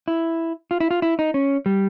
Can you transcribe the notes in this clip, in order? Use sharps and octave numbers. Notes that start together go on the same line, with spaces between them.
E4
F4
E4
F4
E4
D#4
C#4
G3